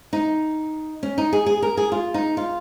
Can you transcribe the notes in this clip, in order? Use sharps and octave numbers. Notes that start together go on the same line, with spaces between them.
D#4
C#4
D#4
G#4
G#4
A#4
G#4
F4
D#4
F4